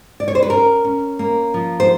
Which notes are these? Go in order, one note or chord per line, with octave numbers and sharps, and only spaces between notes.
D5
C#5
C5
B4
C#4 A#4
C#4
A#3
F3
C5